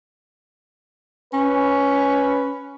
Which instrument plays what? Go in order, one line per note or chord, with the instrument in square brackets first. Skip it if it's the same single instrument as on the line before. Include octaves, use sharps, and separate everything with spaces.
[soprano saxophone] C#4 [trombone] B4